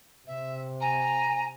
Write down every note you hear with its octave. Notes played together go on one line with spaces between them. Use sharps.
C3 E5
G#5 A#5